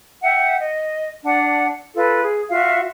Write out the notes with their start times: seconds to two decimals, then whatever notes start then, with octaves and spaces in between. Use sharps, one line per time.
0.22 E5 F#5 G5
0.58 D#5
1.25 D4 D5 F#5
1.95 F4 A4 B4
2.23 G#4
2.50 F4 F#4 E5 F5